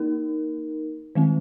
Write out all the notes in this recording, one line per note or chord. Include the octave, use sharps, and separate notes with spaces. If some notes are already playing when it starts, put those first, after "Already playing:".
Already playing: A#3 D#4 A#4
D#3 G#3 C4